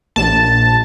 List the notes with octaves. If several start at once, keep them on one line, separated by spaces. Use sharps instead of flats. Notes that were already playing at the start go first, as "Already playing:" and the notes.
A#1 A5